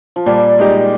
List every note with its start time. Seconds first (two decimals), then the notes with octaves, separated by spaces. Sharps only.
0.16 F3
0.26 A#2 G3
0.59 G#3 D#4 G4